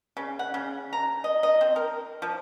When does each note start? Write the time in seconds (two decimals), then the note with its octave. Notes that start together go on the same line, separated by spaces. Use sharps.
0.17 C#3
0.39 F#5
0.54 C#3
0.93 A#5
1.24 D#5
1.43 D#5
1.61 C4
1.76 A#4
2.22 F3